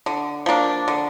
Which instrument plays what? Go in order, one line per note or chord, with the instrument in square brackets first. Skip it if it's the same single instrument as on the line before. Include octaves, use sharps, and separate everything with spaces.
[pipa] D3
F3 A#3 D4
D3